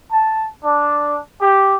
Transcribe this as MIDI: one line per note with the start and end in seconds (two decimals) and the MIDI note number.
0.11 0.47 81
0.64 1.19 62
1.42 1.77 67